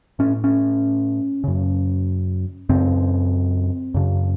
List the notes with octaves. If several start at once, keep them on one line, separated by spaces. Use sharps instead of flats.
A2 C#4
C#4
F#2 C#3
F#2 C#3 C4
F#2 C#3